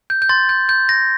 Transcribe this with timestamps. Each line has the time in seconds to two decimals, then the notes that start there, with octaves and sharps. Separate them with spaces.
0.10 G6
0.22 G6
0.29 C6 A6
0.49 G6
0.69 G6
0.89 A#6